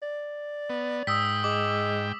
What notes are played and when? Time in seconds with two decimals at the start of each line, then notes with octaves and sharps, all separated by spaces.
0.02 D5
0.70 B3
1.07 G#2 G5 D#6 E6 B6
1.44 G#3 D6